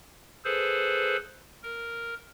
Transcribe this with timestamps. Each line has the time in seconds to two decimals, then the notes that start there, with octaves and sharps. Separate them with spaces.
0.45 G#4 A4 B4 C5
1.63 A#4